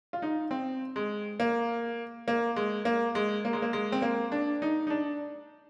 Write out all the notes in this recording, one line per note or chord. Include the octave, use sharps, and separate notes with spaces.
F4
D#4
C4
G#3
A#3
A#3
G#3
A#3
G#3
A#3
G#3
A#3
G#3
C4
A#3
D4
D#4
D#4
D4